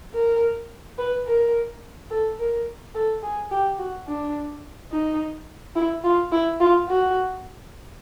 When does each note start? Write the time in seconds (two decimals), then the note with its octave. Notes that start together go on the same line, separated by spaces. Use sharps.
0.14 A#4
0.98 B4
1.26 A#4
2.10 A4
2.39 A#4
2.95 A4
3.23 G#4
3.51 G4
3.78 F#4
4.07 D4
4.92 D#4
5.75 E4
6.04 F4
6.32 E4
6.60 F4
6.89 F#4